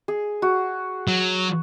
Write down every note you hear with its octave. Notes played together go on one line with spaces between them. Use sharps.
G#4
F#4
F#3